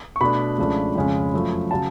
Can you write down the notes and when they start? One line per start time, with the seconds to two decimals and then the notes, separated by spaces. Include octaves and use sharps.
0.16 C#6
0.21 B2 A3 D4 B5
0.58 C#2 C#3 F3 A3 D4
0.96 F2 C#3 G#3 C#4
1.34 F#2 F3 A3
1.71 C#3 F#3 A5